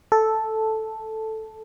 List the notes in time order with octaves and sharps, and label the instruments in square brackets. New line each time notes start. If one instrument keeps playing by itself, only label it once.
[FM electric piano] A4